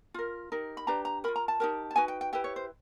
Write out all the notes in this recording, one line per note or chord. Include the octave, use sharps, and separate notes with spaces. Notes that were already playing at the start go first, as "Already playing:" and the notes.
F4 A#4
D#4 G4 A#4
B5
D4 G4 B4 A#5
A#5
F4 A#4 B5
A#5
A5
D#4 G4 A#4
A5
D#4 F#4 B4 G#5
G5
G5
E4 G4 B4 G5
C#5
C5